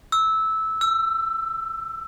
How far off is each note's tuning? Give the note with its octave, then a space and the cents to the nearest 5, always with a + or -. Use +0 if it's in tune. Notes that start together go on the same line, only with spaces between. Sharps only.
E6 -15
E6 +20